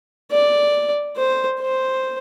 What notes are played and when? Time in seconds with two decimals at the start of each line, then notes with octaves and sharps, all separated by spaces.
0.32 D5
1.17 C5
1.60 C5